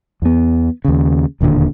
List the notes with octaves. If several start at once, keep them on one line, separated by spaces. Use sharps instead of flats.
E2 B3
D#2 C#3
E1 D#2 A#2 D3